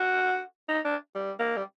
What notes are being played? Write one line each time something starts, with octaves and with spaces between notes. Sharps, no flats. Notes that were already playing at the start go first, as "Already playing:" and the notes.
Already playing: F#4
D#4
D4
G3
A#3
G3